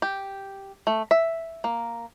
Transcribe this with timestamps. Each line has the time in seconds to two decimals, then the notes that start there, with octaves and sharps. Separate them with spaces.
0.02 G4
0.87 A3
1.11 E5
1.64 A#3